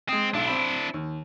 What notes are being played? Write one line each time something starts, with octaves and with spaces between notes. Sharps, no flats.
G#3 C4 D#6
B1 D4 E4
C4 B5
D#2